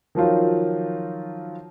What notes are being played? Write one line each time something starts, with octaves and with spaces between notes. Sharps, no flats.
D#3 F3 F#3 F4